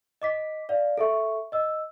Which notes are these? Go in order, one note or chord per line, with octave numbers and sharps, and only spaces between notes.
D#5 D6 B6
D5 F5
A4 E5 C#6
D#5 E6